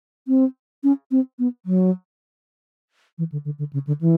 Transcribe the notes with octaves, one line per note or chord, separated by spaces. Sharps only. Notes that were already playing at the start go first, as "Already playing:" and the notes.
C4
C#4
C4
B3
F#3
E3
D3
D3
D3
C#3
D3
E3